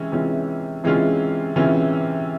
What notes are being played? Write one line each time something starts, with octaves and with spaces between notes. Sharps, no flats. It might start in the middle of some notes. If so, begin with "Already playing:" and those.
Already playing: C3 E3 G#3 C#4
C3 E3 G#3 C#4 F4
C3 E3 G#3 C#4 F4
C3 E3 G#3 C#4 F4